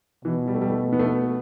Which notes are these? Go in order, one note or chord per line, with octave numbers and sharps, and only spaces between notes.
B2 E3
G3
A3
G3
A3
B3
A3
B3